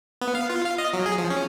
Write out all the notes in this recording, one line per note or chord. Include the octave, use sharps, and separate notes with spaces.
B3
F5
F4
F5
D#5
F#3
G#4
F3
C#4